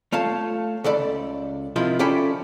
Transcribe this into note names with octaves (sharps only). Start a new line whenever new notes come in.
A3 F4 C#5 F5 A5
C#2 A4 D5 B5
C3 D#3 F3 E4 F4
C#4 F4 A4 D5 G5 B5